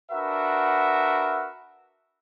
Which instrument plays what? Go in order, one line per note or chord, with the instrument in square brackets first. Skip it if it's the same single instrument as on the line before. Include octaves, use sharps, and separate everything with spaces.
[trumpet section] D4 F#4 A#4 B4 E5 F#5